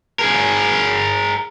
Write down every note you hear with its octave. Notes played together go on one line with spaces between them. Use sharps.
G#4 A#4